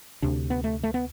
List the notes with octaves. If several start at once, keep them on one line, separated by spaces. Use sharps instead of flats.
D2 C3 D4
B3
A3
A3
B3